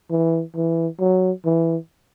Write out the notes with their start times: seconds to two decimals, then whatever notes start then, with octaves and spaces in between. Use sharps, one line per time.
0.10 E3
0.56 E3
1.00 F#3
1.45 E3